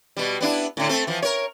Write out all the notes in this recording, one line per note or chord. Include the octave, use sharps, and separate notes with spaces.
B2 G3
B3 D4 E4
A2 D3
A3 C4 A4
E3 F3
A#4 C#5